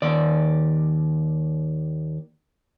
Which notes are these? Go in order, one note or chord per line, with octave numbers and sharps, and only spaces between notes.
D#2 D5